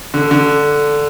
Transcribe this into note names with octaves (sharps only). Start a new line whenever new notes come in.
D3
D3